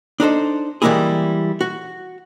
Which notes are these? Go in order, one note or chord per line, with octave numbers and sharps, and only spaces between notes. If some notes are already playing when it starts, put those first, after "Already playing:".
D4 D#4 A4 C5
E3 G3 G#3 A#3 E4 G#4
F#4